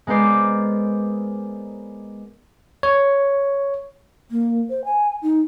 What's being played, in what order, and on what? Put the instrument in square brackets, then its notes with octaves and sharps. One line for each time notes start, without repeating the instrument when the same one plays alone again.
[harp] G#3 B3 A#4 C5 D5
[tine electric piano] C#5
[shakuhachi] A#3
C5
G#5
D#4